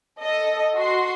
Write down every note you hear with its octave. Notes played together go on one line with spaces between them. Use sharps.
A4 D#5
F#4 C6 C7